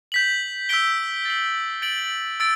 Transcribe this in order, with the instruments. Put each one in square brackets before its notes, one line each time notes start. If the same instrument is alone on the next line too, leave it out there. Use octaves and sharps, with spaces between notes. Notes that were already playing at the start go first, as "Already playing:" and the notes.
[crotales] G6 B6 F#7
E6 G6 B6 D7 G7
A6 C7 F#7
A6 D7 F#7
E6 A6 D7